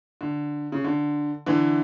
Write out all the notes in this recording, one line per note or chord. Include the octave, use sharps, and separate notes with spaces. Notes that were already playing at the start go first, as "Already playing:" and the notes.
D3
C#3
D3
D3 E3